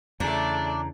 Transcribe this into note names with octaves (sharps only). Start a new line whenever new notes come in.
E2 C#3 A3 D4 D5 A#5